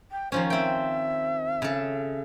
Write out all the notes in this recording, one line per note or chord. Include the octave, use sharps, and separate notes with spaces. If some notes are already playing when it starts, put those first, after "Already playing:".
G5
D#3 F3 C#4 C5
C4 E5 G5
C#3 A4